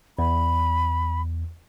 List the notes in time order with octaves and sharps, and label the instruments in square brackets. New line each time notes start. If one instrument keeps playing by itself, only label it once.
[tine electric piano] E2 [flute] B5